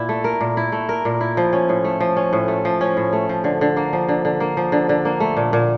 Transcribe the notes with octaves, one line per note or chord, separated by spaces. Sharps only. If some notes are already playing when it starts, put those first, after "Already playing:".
Already playing: A#2 E4
A3
A#4
A#2
E4
A3
A#4
A#2
E4
F3
C#4
A2
A3
F3
C#4
A2
A3
F3
C#4
A2
A3
F3
D3
D3
A#3
F3
D3
D3
A#3
F3
D3
D3
A#3
A3
A#2
A#2